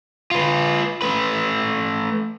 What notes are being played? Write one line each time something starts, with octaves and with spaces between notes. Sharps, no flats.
F4 B4
A3 B4